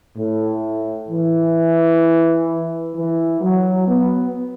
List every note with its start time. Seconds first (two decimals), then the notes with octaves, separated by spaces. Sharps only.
0.17 A2
1.09 E3
2.95 E3
3.41 F#3
3.87 B3